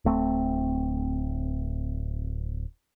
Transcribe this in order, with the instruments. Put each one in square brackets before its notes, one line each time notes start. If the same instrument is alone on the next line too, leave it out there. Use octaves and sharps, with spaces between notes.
[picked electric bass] D1 A3 C4